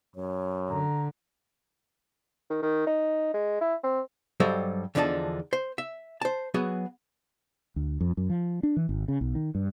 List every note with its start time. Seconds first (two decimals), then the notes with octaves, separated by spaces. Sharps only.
0.16 F#2 C#5
0.70 D3 A#5
2.50 D#3
2.62 D#3
2.87 D#4
3.34 G#3
3.61 E4
3.83 C4
4.40 G2 F#3 G3 A4 C5 D#5
4.95 E2 D3 F3 D4 D#4 A5
5.53 C5
5.78 E5
6.22 C5 A5
6.54 F#3 B3 F#4 G#4
7.76 D2
8.01 F2
8.17 F#2
8.30 F3
8.63 D4
8.77 E3
8.89 G#1
9.08 C#3
9.21 B1
9.35 D#3
9.55 G2